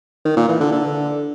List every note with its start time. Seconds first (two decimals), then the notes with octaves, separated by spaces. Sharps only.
0.25 D#3
0.37 A#2
0.48 E3
0.60 D3
0.72 D3